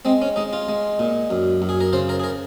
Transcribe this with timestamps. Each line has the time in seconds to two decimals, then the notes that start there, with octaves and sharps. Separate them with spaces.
0.05 G#3 C4
0.22 C#4
0.36 G#3 D#4
0.53 F4
0.69 G#3
0.99 A#2
1.30 F#2
1.62 F#2
1.69 G#4
1.81 A#4
1.93 C#3 C5
2.09 A#4
2.20 G#4
2.24 A#4